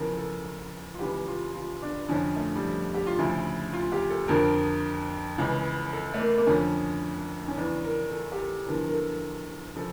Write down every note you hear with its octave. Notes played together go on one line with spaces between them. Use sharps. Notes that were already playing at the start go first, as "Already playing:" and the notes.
Already playing: E2 C#3 F3 A#4
A4
F4
C#2 C#3 E3 G4
F4
F4
D4
F2 D3 F3 C#4
A3
G3
F3
G4
F4
D2 C#3 F3 E4
F4
G4
A4
F2 D3 F3 A#4
C#2 C#3 E3
A4
A3
A#3
A#3
F2 D3 F3 C#4
C#4
E2 C#3 E3 D4
A#4
A4
G4
A4
E2 D3 F3 A#4
A#4
A4
C#3 F3 A4